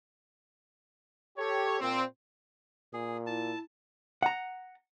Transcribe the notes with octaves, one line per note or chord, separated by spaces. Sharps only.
G4 A4 C#5
A#2 C4
A#2 G#4
E4 A5
F#5 A#5